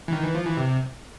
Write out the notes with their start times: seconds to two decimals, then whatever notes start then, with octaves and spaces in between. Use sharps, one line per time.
0.08 E3
0.13 D#3
0.23 E3
0.35 F3
0.46 E3
0.57 C3